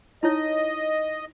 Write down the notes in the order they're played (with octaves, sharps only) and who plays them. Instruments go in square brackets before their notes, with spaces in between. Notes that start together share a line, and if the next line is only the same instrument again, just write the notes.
[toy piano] D#4 E4 C#5 [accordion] D#5